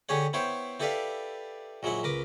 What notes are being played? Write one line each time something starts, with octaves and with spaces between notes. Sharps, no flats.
D3 G4 G#4 C#5 F#5
B3 E4 C5 C#5 G5
E4 G4 A4 B4 D5 F5
A#1 F#3 G#3 E4 F#5
C#2 A#4 B4 D6